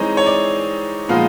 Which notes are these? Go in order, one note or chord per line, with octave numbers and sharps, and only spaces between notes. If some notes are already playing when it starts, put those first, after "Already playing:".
Already playing: E3 G#3 C4 D#4 C#5
C#5
D5
A#2 F3 G#3 B3 D#4 F5